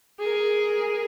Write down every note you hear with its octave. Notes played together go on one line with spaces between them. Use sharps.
G#4 A#4